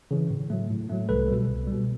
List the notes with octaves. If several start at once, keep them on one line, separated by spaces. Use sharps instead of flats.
C#3 E3
A2
F#3 A3
A2
F#3 A3
C2 A4 B4
B2 G3
C2
B2 G3